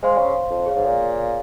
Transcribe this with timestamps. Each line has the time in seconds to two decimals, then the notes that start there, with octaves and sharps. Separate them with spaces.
0.03 G#3 C5 F5 C6
0.17 C#3
0.50 F2
0.66 G#4 C#5 F5
0.76 G#2
0.86 A#2